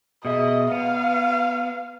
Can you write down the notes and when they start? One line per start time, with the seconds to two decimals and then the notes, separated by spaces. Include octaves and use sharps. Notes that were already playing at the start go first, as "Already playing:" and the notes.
0.25 B2 G#4 D#5 E5
0.72 B3 F5